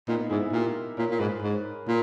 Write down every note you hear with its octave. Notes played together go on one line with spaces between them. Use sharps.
A#2 B3 D#4
B3 D#4
G#2 E4 G#4
E4 G#4
A#2 G4 A#4
A#2 A#4 C#5
A#2
G#2 G#4 B4
G#2
A#2